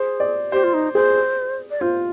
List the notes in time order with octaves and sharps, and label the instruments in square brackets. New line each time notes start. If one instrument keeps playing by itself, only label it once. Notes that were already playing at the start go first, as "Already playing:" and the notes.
Already playing: [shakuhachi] G#4 [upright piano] C5
[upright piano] D5
[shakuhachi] G4 [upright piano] C5
[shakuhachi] F4
D#4
[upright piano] G#4 [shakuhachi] C5
[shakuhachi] D5
[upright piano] F4 [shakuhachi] C5